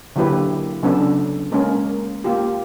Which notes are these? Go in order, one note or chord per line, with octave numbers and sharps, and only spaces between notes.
D3 F#3 A#3 E4 G4 B4
C#3 F#3 B3 C#4 D4 A4
G#3 A#3 B3 C#4 A#4
A#3 F4 G4